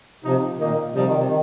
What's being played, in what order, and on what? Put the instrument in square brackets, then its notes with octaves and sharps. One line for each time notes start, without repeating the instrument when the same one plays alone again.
[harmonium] C3 [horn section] F3 D#4
[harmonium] A#2 [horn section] D#3 A#3 D#4
[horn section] C3 G3 D#4 [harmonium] F3
[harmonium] D#3
C3
D#3